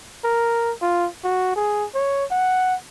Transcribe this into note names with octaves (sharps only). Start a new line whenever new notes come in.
A#4
F4
F#4
G#4
C#5
F#5